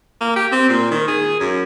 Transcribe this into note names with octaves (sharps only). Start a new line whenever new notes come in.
A#3
G4
C4
A#2
D#3
G#4
F#2